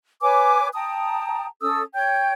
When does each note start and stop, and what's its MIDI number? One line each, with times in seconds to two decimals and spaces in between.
0.22 0.68 71
0.22 0.68 73
0.22 0.68 80
0.22 0.68 86
0.74 1.46 79
0.74 1.46 81
0.74 1.46 82
0.74 1.46 87
1.62 1.81 61
1.62 1.81 69
1.62 1.81 87
1.62 1.81 88
1.94 2.33 73
1.94 2.33 79
1.94 2.33 91